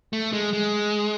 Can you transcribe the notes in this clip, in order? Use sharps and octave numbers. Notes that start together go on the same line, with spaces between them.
A3
G#3
G#3